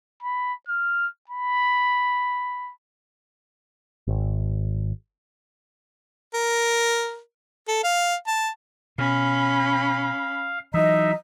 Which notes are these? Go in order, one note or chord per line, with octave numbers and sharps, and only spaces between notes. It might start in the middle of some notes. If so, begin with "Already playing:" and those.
B5
F6
B5
G#1
A#4
A4
F5
A5
B2 C#4 F5 B5
E3 F#3 D#4 D#5 E5